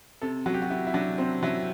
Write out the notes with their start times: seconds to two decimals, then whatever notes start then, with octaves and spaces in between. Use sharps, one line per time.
0.22 C3 A4
0.46 F#3 F#4
0.54 G4
0.62 F#4
0.70 C3 E4
0.87 E4
0.94 F#3 D4
1.18 C3 C4
1.43 F#3 E4